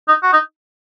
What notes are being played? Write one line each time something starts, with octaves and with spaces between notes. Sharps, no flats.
D#4
F#4
D#4